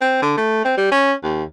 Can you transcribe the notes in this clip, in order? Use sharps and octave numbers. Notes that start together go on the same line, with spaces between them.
C4
D3
A3
C4
G3
C#4
D#2